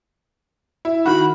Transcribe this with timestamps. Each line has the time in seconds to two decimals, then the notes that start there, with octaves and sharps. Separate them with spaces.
0.85 E4
1.06 D#3 F#4 B5